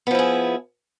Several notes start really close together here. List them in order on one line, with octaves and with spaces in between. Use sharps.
B3 F3 E4 G#4